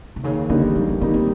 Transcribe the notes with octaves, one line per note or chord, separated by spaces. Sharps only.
C3
D#2 C#3
D3 D#3 G3 A#3 D#4
D#2 F3
B3
D3 G3 A#3 C4 D#4
C4